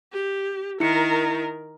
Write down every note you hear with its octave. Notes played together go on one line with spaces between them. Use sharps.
G4
D#3 E4 A#4 C#7